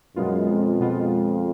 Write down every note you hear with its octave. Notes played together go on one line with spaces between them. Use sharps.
F#2 B2 G#3 B3 F4
F2
B2 G#3 B3 F4